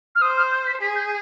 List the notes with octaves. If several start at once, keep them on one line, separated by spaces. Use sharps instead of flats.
F6
C5 D#6
F6
G6
B6
G#4 B6
G6